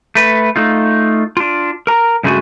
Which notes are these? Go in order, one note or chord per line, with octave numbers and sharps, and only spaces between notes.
A3 B4
A3 D#4 F4
D4 F4
A#4 A#5
G2 C#3 G#3 A3 F#4 G#5